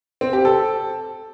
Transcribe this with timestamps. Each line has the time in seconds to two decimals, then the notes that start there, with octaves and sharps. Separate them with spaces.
0.21 C4
0.33 G4
0.45 A4